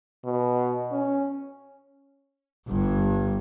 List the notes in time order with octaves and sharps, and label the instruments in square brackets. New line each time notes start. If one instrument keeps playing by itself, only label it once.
[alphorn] B2
C#4
[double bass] G1 G2